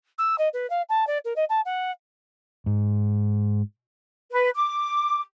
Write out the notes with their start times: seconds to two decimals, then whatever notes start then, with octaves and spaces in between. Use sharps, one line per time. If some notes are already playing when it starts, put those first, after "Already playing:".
0.18 E6
0.38 D#5
0.53 B4
0.70 F5
0.89 A5
1.07 D5
1.25 A#4
1.36 D#5
1.49 A5
1.65 F#5
2.66 G#2
4.31 B4
4.56 D6